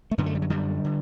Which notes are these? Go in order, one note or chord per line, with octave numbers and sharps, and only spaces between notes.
A3
F#2 D3 B3
A3
G3
F#3
F#2 D3 G3
D3